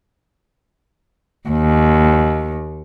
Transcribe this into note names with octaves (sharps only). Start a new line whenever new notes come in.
D#2